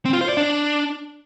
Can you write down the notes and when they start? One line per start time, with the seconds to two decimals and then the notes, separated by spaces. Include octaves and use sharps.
0.05 C4
0.13 F4
0.21 C5
0.29 D5
0.37 D4